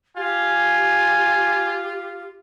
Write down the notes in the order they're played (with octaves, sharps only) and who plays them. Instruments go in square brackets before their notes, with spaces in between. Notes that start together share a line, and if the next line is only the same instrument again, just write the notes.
[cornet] F4 [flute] G4 [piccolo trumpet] G#5